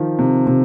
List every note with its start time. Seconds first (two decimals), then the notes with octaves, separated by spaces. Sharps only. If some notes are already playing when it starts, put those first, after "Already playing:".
Already playing: D#3 F3
0.19 C3
0.47 C3